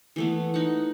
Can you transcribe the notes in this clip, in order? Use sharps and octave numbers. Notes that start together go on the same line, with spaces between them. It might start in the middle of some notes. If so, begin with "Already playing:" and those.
E3 A3 B3
D#4 F#5